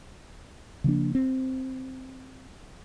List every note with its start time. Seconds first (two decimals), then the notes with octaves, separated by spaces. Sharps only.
0.84 C#3 F3 A#3 D4
1.15 C4